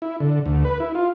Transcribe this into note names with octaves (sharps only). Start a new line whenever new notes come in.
E4
D3
D2
B4
E4
F4